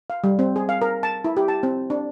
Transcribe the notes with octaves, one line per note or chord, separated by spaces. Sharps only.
F5
G3
C4
G#4
F5
A#4
A5
E4
G4
A5
C4
D4